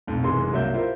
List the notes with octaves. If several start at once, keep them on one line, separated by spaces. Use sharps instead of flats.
B1 F2 A2
F1 F#2 E3 G#3 C6
C2 G2 F#3 A#3 E5 G6
E4 F4 G4 A#4 C5 E5